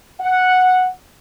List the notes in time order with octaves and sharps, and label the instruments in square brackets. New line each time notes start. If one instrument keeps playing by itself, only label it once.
[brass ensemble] F#5